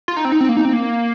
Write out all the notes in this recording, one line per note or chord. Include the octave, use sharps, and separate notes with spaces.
F4
D#4
C4
D#4
C4
A#3
D#4
C4
A#3